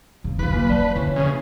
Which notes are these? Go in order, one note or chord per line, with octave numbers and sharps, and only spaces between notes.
C#3 C4
F1 D2 F4 B4 D6
F#3 A#3
C#4 C5 D5 A5
D3 E3 F3 C#4
C#3 G#3 A#3 D#5